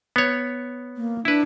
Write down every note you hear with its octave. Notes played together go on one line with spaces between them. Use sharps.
B3 C#5
A#3
D4 E4 B4